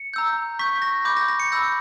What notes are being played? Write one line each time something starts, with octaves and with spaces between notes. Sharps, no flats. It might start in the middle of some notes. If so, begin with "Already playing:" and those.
Already playing: C#7
A#5 E6 G6
C#6 G6 B6
A#6
B5 D6 G6
A#6
A#6
C#7
B5 E6 G6 A#6